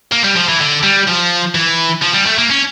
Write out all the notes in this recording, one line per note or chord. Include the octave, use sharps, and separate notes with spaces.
A#3
G3
F3
E3
D3
G3
F3
E3
F3
G3
A3
A#3
C#4